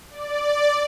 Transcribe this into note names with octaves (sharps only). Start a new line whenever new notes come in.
D5